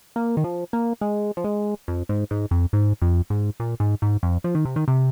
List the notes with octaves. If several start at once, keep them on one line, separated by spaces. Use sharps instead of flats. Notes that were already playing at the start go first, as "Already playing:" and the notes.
A#3
D#3
F3
A#3
G#3
F3
G#3
F2
G#2
G#2
F2
G#2
F2
G#2
A#2
G#2
G#2
F2
F3
D#3
C3
D#3
C3